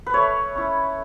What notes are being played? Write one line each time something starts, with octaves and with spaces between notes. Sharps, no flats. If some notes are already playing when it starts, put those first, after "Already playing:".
B4
A3 C#5
C#4 E4